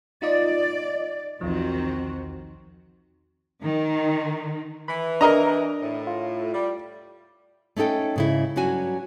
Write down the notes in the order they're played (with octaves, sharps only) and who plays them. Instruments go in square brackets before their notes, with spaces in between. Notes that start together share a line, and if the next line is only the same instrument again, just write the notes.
[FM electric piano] D#4 F4 D#5 [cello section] D5
[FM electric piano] B1 E2 F3 [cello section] D#3 C4 F#4
[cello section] D#3
[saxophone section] E3 [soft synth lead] B5
[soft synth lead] D4 [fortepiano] A#4 D#5 A#5
[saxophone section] A2
[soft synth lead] F4
[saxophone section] G3
[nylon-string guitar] A3 C#4 D#4 A4 G5
G#2 C#3 E4
G2 F#3 C#4 F#4 G#5